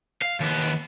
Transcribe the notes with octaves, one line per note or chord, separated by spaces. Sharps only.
F5
D#2 B3